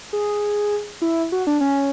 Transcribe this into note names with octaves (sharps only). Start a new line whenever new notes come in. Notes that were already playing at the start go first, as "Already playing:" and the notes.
G#4
E4
F#4
D4
C#4